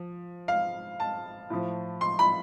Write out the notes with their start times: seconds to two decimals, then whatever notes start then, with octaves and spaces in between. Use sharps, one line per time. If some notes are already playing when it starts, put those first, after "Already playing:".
Already playing: F3
0.48 F5
1.00 A5
1.50 A2 F3
2.01 C6
2.19 B5